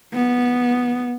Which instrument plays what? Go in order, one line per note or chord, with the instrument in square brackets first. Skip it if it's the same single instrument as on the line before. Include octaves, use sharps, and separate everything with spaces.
[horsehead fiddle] B3